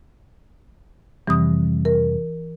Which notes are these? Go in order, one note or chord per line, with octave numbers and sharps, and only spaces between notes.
F2 C3 E3 G3 D#6
A#4